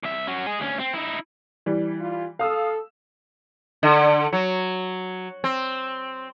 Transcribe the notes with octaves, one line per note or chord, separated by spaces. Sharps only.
C2 E5
C#4 F#4
G#4 D#5
D2 C#4
C4
D#4 E4
E3 G3
F4
A4 F5 D#6 E6
D3
F#3
C4